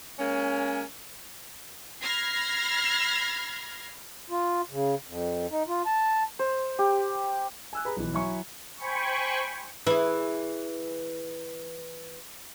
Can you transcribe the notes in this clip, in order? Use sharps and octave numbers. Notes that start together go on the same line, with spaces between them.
G#3 A#3 C#4
B5 F6 G#6 A#6 C7
F4
C#3
F2
D#4
F4
A5
C5
G4
G#5 E6 F#6
G#4 B4 A#5 B5
B1 E3
F#3 E4 E5 G#5 C#6
C5 G5 G#5 B5 C#6
E3 E4 G#4